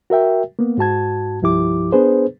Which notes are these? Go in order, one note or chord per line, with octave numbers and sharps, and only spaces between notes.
F#4 A#4 E5 G5
A#3 B3
G#2 F#4 A5 G#6
C2 G2 F3 E4 G4 D6
B3 D4 G#4 B4 C5